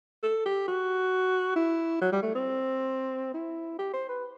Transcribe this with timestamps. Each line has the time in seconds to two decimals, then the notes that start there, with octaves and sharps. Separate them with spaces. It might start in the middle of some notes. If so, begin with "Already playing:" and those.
0.23 A4
0.46 G4
0.68 F#4
1.56 E4
2.01 F#3
2.12 G3
2.23 A3
2.35 C4
3.34 E4
3.79 G4
3.93 C5
4.09 B4